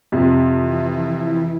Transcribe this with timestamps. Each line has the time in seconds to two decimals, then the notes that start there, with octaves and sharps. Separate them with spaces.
0.12 F2 C3
0.57 E3 E4